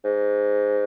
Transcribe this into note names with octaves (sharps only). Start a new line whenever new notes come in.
G#2